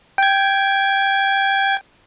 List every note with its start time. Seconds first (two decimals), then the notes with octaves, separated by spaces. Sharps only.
0.18 G5 G#6